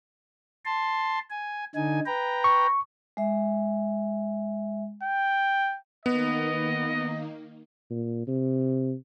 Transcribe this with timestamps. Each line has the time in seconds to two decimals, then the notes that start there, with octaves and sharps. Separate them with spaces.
0.65 A5 C6
1.30 G#5
1.75 D3 D#4 G#5
2.06 B4 G5 A#5
2.44 C#6
3.17 G#3 E5
5.03 G5
6.06 D#3 A#3 B3 D#4 D#5
7.91 A#2
8.27 C3